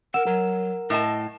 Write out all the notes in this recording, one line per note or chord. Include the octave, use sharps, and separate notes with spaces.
A#4 F#5 E6 E7
F#3 A#4
A2 D#5 A5